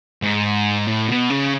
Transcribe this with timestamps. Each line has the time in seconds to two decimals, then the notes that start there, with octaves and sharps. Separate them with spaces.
0.22 G#2
0.87 A2
1.08 B2
1.30 C#3